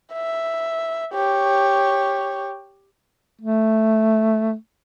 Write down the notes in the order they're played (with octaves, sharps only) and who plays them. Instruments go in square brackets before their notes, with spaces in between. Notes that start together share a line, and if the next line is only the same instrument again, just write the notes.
[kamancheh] E5
G4 C#5
[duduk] A3